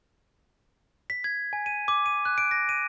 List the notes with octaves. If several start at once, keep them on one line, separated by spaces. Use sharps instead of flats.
B6
G#6
G#5
D#7
D6
D#7
F#6
D7
A#6
D#7